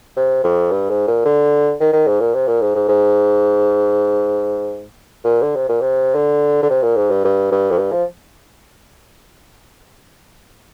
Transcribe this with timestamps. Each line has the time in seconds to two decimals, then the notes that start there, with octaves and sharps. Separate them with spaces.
0.17 C3
0.44 F2
0.71 G2
0.90 G#2
1.07 A#2
1.25 D3
1.80 D#3
1.93 D#3
2.07 G#2
2.20 A#2
2.34 C3
2.47 A#2
2.61 G#2
2.75 G#2
2.89 G#2
5.24 A#2
5.42 D3
5.56 C3
5.69 A#2
5.81 C3
6.15 D3
6.63 D3
6.70 C3
6.83 A#2
6.96 G#2
7.10 G2
7.24 G2
7.52 G2
7.70 F2
7.78 G2
7.92 F3